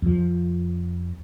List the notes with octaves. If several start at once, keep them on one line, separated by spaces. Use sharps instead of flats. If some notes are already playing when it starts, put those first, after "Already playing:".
F2 F3